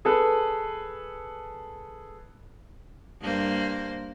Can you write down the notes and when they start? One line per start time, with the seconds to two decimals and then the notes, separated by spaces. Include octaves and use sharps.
0.05 G#4 A4 B4
3.21 G2 A#3 C5